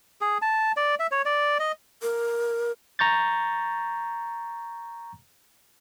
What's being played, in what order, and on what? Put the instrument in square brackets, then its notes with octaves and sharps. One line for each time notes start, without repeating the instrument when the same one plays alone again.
[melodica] G#4
A5
D5
E5
C#5
D5
D#5
[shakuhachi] A#4
[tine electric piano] A#5 C#6 G6 A6